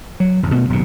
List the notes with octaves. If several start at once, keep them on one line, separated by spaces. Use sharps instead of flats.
F#3
G1 D#2
B2 A3
D#1 B1 G2 C3